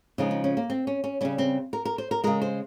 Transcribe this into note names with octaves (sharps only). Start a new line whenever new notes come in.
C#3 F3 G#3 D#4
D#4
C#4
A#3
C4
C#4
C#4
C#3 G3 C#4
C4
A#4
A#4
C5
A#4
C#3 G#3 A#4
C5